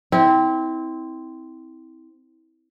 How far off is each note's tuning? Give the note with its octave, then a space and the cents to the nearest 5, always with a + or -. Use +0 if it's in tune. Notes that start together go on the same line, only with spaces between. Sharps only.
C4 -10 E4 -30